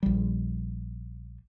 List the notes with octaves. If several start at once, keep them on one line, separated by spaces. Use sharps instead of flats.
A#1 G3